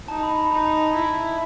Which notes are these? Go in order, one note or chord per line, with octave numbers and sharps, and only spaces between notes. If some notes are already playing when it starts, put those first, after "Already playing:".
D#4 A5
B5
B5
D#4 A#5
A5
E4